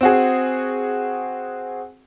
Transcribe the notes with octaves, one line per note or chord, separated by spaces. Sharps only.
C4 F#4 G#4